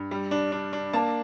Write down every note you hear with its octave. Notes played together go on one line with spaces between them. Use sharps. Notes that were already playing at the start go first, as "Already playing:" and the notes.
Already playing: G2
G3
D4
D4
D4
A#3 A5